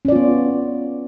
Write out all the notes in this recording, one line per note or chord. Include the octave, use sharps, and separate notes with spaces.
B3 C#4 F4 D5